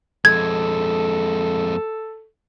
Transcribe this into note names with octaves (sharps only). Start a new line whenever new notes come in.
F2 G#3 A4 G#6